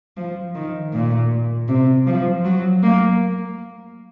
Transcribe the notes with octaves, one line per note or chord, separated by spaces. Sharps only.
F3
D#3
A#2
C3
F3
F#3
A#3